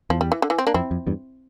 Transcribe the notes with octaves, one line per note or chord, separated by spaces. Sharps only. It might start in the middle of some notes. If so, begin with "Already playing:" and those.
E2 F3
G3
E3
D3
E3
C4
A#3 D4
F2 C4 E4
F2
E2 G2